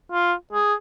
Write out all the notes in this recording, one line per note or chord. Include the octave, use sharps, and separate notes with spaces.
F4
G#4